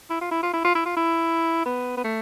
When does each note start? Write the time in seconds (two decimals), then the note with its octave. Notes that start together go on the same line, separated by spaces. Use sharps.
0.10 E4
0.21 F4
0.31 E4
0.43 F4
0.53 E4
0.64 F4
0.75 E4
0.85 F4
0.96 E4
1.66 B3
1.97 B3
2.04 A3